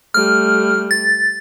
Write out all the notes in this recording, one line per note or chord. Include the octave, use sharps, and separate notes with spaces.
G3 A3 F6
A6